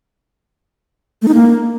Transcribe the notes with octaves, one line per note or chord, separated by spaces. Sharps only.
A3
D#4
A#3